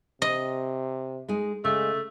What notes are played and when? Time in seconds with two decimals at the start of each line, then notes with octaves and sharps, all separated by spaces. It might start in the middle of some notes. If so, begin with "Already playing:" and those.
0.22 C3 D#5
1.28 G#3 D#4 G#4
1.65 C#3 G#3 A3